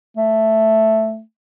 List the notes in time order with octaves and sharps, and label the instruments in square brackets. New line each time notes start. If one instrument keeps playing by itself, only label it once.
[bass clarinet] A3